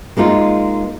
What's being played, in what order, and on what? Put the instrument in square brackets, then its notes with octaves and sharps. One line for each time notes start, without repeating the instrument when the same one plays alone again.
[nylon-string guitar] G#3 A#3 D#4 F4